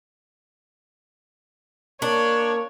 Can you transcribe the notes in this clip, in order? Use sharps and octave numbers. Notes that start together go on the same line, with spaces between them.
A#3 D4 C#5